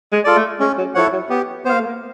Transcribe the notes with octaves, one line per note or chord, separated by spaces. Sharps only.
G#3
F4 A4 D5
A3
G#3 C#4
F#3
F3 E4 A4 C#5 F#5
F#3
B3 G4
A#3 B3 C5 F5
A3
A#3